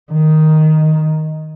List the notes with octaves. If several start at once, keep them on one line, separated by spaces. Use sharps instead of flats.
D#3